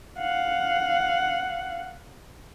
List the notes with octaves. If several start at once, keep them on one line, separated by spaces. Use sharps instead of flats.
F5 F#5